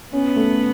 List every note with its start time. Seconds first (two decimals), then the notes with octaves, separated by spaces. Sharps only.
0.13 B3 C#4
0.36 A3